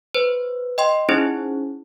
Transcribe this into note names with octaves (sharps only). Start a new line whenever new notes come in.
B4 C5
D#5 G5 C6
C#4 D#4 E4 G#4 C5